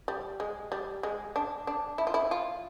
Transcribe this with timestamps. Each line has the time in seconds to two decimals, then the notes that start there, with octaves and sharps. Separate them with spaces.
0.08 G3
0.40 G#3
0.72 G3
1.03 G#3
1.36 D4
1.67 D4
1.98 E4
2.07 F4
2.14 E4
2.31 F4